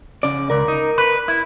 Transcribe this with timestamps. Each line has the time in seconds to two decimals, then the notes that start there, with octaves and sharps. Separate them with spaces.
0.23 C#3 C#4 D5
0.50 C#2 A#4 D5
0.68 D#4
0.98 B4
1.28 E4